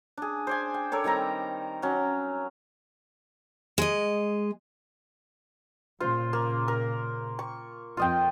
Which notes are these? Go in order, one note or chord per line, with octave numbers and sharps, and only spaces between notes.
D4 G#4
C5 D5 G#5
G5
A4 A#4 C#5 D5
D#3 G3 C4 A#5
F#3 C#4
G#3 D#5
A#2 C#3 F4 C5
A#3
A#4
C#6
F2 F4 D#5 G5